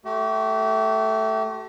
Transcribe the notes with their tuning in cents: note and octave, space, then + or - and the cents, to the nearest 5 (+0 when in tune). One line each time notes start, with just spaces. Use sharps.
A3 +0 G4 -40